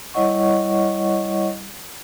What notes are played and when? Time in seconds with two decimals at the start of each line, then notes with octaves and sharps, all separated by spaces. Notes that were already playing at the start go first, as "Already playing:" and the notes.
0.14 G3 E4 C#5 D#5 F#5 C#6